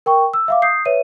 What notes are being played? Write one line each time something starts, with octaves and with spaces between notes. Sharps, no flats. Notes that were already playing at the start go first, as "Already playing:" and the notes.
A#4 G5 C#6
E6
E5 F5 D6
D#6 G6 C7
B4 C#5 E5 D#7